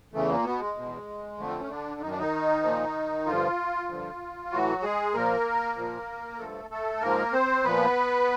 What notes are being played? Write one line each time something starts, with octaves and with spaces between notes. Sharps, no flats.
E2 C#3 E3 A3
A#2 A#3
B2 B3
G#3
E2 B2
F2 D3 F3 A3
C4
C#4
D3 D4
F#2 D#3 D#4
D4
D#3 D#4
A#2 F3
G2 D3 F3 F4
G2 D3 F3
A2 E3 F#3 F#4
G#3 G#4
A#2 F3 A#3 A#4
A#2 F3
G2 D3 F3 A3 A4
A3 A4
G#2 F3 A#3 A#4
C4 C5
A#2 F3 B3 B4